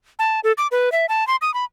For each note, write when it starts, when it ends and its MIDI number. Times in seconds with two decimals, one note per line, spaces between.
0.19 0.40 81
0.44 0.52 69
0.58 0.67 86
0.72 0.92 71
0.92 1.06 76
1.09 1.26 81
1.27 1.36 84
1.42 1.53 87
1.54 1.65 83